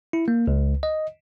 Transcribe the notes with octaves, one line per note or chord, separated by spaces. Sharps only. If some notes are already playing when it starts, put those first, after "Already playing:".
E4
A#3
C#2
D#5